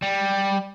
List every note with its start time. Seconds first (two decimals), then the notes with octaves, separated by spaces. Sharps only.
0.02 G3